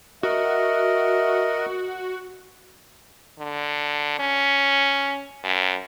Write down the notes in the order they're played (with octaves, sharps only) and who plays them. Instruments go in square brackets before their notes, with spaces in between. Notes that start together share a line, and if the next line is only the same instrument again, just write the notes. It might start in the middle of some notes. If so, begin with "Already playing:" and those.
[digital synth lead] F#4 [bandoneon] A#4 D#5 [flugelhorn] E5
[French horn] D3
C#4
F#2